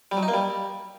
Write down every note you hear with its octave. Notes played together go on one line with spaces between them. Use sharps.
G3
F#3
D#4
A#3
G3